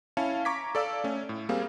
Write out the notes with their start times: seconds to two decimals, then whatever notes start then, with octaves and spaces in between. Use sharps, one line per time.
0.17 C#4 E4 F5 A5 C#7
0.45 A#5 C#6 D6 G#6 B6
0.75 A4 D5 F5 E6
1.04 A3 C#4
1.29 A2
1.49 G3 A#3 C4 G#4 F5